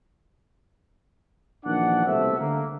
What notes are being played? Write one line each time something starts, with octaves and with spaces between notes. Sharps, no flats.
A#1 D#3 E3 D4 D5 F#5
C2 B2 A3 C5 E5
D3 A#3